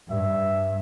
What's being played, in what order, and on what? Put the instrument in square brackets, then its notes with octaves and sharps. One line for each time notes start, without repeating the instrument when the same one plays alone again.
[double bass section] G2 [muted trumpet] E5